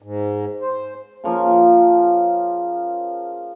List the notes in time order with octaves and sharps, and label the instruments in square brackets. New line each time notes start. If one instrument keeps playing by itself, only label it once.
[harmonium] G#2
C5
[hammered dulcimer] C#3 F3 A#3